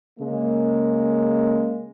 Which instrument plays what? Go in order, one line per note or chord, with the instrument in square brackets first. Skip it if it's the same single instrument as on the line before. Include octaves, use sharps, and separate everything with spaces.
[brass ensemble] C#3 G#3 A#3